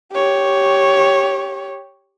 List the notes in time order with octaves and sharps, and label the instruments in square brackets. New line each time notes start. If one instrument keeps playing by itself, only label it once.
[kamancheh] G4 C#5